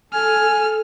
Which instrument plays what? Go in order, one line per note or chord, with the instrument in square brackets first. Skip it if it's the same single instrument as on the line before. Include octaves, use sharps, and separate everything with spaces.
[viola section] A4 [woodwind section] G#5 [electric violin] F6